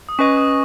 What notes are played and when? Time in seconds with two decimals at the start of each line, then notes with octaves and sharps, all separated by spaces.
0.09 D#6
0.19 C#4 B4 D#5 G#5 C#6
0.37 D#6